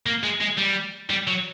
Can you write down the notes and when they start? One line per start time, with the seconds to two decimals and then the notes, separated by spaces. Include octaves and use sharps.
0.06 A#3
0.23 G#3
0.41 G#3
0.58 G3
1.10 G3
1.27 F#3